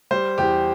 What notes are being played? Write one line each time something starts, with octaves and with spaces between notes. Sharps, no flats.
G3 C5
E2 G4